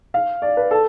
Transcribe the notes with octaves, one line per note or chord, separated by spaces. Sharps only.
F5
D5
B4
A4